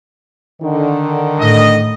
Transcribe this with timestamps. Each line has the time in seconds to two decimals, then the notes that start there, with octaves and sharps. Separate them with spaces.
0.62 D3 D#3
1.39 A2 D#5